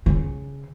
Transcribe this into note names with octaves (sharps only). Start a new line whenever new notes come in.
C#3